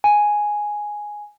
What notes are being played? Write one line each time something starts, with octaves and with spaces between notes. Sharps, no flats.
G#5